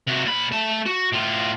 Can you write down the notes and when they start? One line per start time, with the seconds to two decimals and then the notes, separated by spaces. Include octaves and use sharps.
0.07 C3 F#4
0.25 A#2 B5
0.52 A3 A5
0.86 F#4
1.13 A2 F4